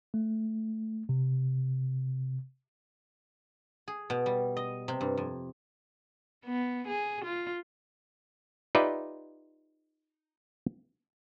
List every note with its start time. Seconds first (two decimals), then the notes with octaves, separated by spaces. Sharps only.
0.14 A3
1.09 C3
3.88 G#4
4.10 B2
4.26 G3
4.57 D#5
4.88 C3
5.01 G2
5.17 F2
6.46 B3
6.87 G#4
7.25 F4
8.75 D#4 F4 G4 B4 D5 E5